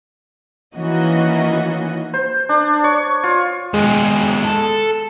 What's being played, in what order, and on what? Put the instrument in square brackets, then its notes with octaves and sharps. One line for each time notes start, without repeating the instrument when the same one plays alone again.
[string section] D#3 E3 A#3 C#4 F#4 D#5
[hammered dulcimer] C5
D4
C#5
F4
[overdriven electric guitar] D#2 B2 [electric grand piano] G#3
[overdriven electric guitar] A4